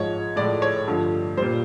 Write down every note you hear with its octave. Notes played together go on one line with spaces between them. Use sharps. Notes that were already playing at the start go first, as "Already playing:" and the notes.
Already playing: G#2 F3 G#3 C#5
A2 F3 G#3 D5
C#5
G2 D3 F3 A3
A#2 G3 C5